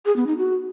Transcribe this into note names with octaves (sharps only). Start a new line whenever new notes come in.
G#4
B3
D#4
F#4